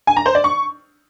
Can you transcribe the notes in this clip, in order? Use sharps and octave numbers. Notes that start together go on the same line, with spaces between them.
G#5
A#5
C5
D5
C#6